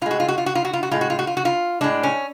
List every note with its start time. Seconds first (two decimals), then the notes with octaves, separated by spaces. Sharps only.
0.01 A2 F4
0.06 G#3 F#4
0.20 F4
0.28 F#4
0.38 F4
0.46 F#4
0.55 F4
0.65 F#4
0.73 F4
0.83 F#4
0.91 A2 G#3 F4
1.01 F#4
1.10 F4
1.19 F#4
1.27 F4
1.37 F#4
1.45 F4
1.81 A2 G#3 D4
2.03 C#4